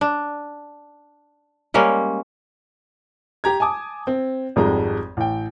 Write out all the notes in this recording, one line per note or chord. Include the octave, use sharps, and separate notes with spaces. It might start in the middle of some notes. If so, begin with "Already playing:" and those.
D4
G3 G#3 A#3 C#4
G4 A#5 G#6
G#5 A5 D6 D#6
C4
G#1 F2 G3 G#3 A#5
A1 G5